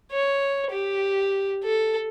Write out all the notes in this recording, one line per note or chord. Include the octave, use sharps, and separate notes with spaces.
C#5
G4
A4